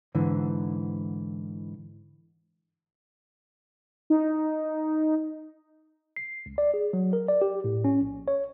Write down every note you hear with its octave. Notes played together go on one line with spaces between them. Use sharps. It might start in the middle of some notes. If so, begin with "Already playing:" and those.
G#2 D3 E3
D#4
C7
C#2
D5
G#4
F#3
A#4
D5
G4
A2
C#4
A#1
C#5